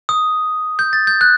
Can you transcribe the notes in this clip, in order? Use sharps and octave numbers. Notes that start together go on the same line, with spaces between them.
D#6
G6
A6
G6
F#6